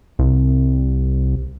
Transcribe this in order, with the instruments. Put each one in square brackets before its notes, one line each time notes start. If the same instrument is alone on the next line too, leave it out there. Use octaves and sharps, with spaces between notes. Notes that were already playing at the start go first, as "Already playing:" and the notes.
[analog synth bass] C2